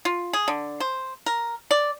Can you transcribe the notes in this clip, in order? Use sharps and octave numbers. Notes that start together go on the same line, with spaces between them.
F4
G#4
D3
C5
A#4
D5